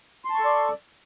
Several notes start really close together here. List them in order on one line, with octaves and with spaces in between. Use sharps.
C6 A5 C#6 A4 D5